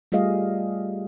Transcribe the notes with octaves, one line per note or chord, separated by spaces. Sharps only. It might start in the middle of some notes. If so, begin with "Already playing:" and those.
G3 A3 F4 G#4 D#5 F5